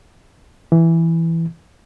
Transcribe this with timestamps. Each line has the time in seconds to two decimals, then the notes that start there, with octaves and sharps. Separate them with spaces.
0.72 E3